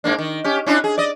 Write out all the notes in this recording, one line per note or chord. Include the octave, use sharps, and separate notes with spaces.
G#2 A#3 D4
D#3
C#4 G4
C#4 D4 E4
G#4
D5 D#5